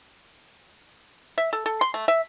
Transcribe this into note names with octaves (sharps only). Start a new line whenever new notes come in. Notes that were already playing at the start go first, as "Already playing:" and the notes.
E5
A4
A4
C6
A3
E5